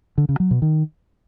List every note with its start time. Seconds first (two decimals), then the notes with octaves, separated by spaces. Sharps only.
0.18 D3
0.29 C#3
0.40 F#3
0.51 B2
0.62 D#3